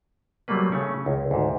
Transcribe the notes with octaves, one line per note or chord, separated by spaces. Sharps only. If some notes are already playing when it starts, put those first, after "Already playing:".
F#3 G3 A3 A#3 B4
C#3 A3 C#4
C#2
D2 G#2